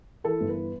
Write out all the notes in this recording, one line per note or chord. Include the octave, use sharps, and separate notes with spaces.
E3 A4
G1
B4